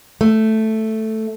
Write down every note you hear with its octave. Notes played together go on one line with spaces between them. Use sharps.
A3